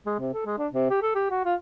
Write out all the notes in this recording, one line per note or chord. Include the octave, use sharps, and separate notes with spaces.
G#3
C3
A4
G#3
D4
C3
G4
A4
G4
F#4
F4